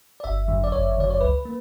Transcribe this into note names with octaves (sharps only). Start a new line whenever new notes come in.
D5
G1 E5
F#2 D3 F#3
D5
G1 C#5
F#2 D3 F#3 D5
C#5
C#2 B4
A#3